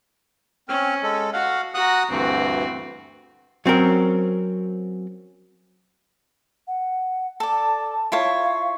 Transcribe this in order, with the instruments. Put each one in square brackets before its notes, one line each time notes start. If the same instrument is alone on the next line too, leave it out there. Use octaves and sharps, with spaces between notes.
[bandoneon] C4 F6 [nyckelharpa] C#4
[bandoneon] G#3 A4
[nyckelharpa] F#4 [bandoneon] F5 F#5
[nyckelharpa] F#4 A#5 [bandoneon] F#5 D#6 F#6
[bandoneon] D2 G2 E3 [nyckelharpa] C4 F#4
[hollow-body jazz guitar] F#3 C4 C#4 A#4
[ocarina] F#5
[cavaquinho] A4 D5 [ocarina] A5
[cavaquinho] E4 F4 C#5
[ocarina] F5